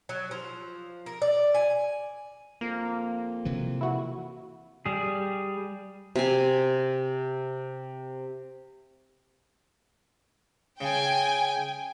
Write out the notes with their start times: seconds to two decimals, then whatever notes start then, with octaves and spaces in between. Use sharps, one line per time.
0.09 F#3
0.31 F3
1.06 A#4
1.22 D5
1.55 G#5
2.61 F2 A#3
3.45 C3 E3 F3
3.81 E4 F#4
4.86 G3 G#4
6.16 C3 G#5
10.81 C#3 G5 G#5